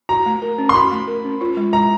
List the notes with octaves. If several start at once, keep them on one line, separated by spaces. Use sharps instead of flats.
F#4 A#5
A3
A#4
C#4
C6
F#4 B5
A3
A#4
C#4
F4
G#3
G#3 A#5